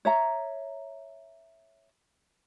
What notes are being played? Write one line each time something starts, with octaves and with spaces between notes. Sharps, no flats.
C#5 E5 A#5